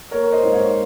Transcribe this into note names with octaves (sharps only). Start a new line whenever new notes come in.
A#3 A#4 C#5
C5 D#5
G#2
C#5 F5